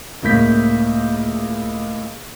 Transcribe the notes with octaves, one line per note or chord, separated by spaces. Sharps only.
C#2 A2 A#3 G6 B6